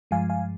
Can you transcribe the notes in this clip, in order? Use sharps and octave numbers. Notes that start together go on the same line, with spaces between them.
G2 F3 G#3 F5 G#5
F5 G#5